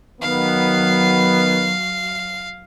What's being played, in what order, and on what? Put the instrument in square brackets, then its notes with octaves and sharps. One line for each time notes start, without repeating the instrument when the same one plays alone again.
[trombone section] D#3 B3 [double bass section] F#3 [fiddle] F5